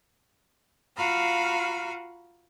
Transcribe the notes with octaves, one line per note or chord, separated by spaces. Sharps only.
F4 F#4 F5 A#5 B5